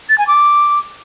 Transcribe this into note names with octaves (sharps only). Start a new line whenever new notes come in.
A6
G#5
D6